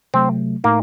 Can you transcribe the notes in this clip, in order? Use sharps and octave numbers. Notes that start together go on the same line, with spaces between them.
C3 F#3 A3 C4
A2 A3 A#3 D#4